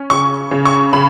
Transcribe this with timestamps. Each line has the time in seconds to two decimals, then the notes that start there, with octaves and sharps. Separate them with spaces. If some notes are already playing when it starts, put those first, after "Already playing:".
Already playing: C#4
0.10 C#3 C#6
0.51 C#3
0.65 C#6
0.93 C#3 B5